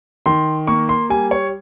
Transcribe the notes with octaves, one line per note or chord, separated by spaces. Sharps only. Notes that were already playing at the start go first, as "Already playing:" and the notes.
D#3 C6
A#3 C#6
C6
G3 G#5
C#5